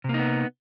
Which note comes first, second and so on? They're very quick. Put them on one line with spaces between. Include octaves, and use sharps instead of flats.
C3 A#3 D#4 B3